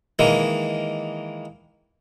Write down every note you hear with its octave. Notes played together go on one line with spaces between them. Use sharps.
D#3 E3 G#3 A#3